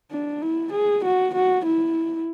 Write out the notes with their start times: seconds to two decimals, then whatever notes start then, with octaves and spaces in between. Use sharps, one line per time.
0.12 D4
0.42 E4
0.72 G#4
1.04 F#4
1.34 F#4
1.65 E4